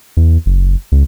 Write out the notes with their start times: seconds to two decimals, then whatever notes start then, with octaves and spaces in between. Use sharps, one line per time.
0.17 E2
0.46 F#1
0.92 C#2